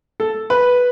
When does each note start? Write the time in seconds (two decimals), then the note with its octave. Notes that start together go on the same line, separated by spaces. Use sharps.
0.20 A4
0.50 B4